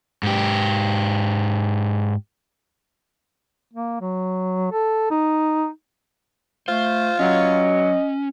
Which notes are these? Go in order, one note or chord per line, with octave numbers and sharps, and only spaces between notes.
G#2 G4
A#3
F#3
A4
D#4
A3 F4 C5
F#3 C#4 D#5